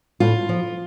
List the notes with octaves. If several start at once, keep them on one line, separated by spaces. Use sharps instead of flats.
A2 F4
F3